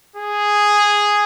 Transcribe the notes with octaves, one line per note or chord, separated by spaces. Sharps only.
G#4